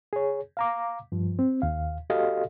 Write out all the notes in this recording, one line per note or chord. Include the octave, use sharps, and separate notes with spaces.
G#4 C#5
F5 A#5 D6
G2 F3
C4
D#2 F5
F#4 G4 A4 D#5 F5